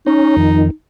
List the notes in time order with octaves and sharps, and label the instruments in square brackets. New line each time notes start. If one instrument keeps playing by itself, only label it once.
[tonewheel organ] C#4 [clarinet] D#4
[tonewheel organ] F2 D#3